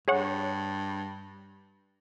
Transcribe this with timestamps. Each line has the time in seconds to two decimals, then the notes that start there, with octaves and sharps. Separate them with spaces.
0.08 G2 G#4 C#5 F#5